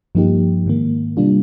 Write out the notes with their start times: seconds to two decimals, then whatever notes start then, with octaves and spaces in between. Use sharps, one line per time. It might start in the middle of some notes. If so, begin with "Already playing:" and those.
0.15 G2 F3 A#3 D#4 G4
0.66 G#2 D#3 A#3
1.17 C3 G3 A#3 D4 F4